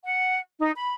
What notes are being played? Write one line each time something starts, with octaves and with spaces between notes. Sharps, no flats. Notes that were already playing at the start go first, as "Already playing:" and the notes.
F#5
D#4
B5